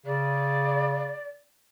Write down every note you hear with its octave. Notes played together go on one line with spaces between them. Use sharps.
C#3 D5